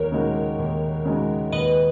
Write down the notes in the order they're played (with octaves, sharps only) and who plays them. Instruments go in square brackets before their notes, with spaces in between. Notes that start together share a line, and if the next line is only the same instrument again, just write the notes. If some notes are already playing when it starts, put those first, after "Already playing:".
Already playing: [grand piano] D#2 [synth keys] A#4 C#5
[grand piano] C#3 G#3 D#4 F#4
D#2
C#3 G#3 D#4 F#4
[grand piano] D#2 [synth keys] B4 D#5